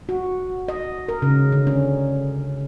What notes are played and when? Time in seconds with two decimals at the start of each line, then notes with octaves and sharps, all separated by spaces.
0.09 F#4
0.68 D#5
1.08 A#4
1.22 C#3
1.52 D3
1.67 C#4